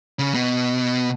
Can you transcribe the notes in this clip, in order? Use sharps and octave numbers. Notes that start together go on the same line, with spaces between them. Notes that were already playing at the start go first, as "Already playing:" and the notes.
C#3
B2